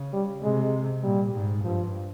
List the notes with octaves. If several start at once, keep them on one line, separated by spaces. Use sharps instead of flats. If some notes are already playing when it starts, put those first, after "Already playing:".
Already playing: C#3
G3
C3 G#3
A#2 G3
G#2
G2 F3